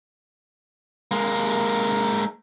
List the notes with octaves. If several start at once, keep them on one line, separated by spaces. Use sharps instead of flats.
G#3 A#3